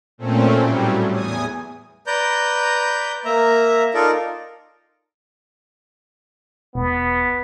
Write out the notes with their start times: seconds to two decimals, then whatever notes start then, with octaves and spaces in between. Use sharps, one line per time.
0.18 A#2 A3 C4 C#4
0.57 A2 F#3 G3
1.11 E2 G#5 D#6
2.07 B4 D5 A#5 G6
3.25 A#3 E5 A#5
3.94 D#4 F4 A4 A#4 D5
6.75 E1 B3